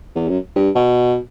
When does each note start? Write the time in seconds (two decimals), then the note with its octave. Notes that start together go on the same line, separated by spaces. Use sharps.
0.16 E2
0.29 F#2
0.56 G2
0.75 B2